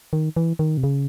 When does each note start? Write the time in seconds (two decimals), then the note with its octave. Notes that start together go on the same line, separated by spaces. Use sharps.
0.13 D#3
0.36 E3
0.59 D#3
0.77 C3
0.83 C#3